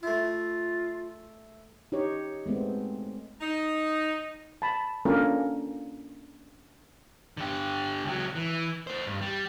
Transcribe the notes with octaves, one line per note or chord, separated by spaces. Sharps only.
A3 E4 F4
D#4 G4 C#5
G#3 A3 B3 C4
D#4
A5 B5
A#3 C#4 D4 F4 A4 A#4
D3 G4
C#2 F#3
E3
A3 C5
G2
G3